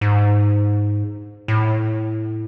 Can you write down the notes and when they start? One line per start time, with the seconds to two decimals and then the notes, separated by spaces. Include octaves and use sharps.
0.01 G#2
1.48 A2